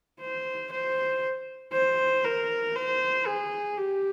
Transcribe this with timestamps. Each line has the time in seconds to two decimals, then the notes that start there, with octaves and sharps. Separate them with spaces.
0.21 C5
0.72 C5
1.73 C5
2.24 A#4
2.76 C5
3.26 G#4
3.77 G4